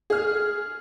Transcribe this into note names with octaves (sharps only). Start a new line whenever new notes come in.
G#4 F6